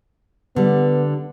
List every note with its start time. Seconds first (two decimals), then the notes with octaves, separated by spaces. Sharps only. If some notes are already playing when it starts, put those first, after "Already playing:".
0.56 D3 G3 B3